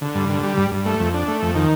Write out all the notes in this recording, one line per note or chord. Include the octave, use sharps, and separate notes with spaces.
D3
G2
D3
G3
G2
G2
A3
F2
D4
A3
F2
D#3